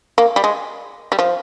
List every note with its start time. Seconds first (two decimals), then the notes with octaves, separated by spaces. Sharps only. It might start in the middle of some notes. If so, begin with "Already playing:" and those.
0.18 A#3
0.36 G3
0.44 G#3
1.12 G3
1.19 F3